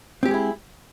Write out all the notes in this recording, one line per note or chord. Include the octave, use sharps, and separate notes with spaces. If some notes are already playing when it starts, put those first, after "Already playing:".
G#3 C4 E4 G4 G#4